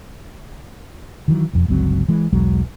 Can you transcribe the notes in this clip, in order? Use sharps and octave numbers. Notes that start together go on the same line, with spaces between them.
D#3 E3 F#3
E1 F2
G1 C#2 F#3 C4
E3 G#3
B1 E2 F#3 G#3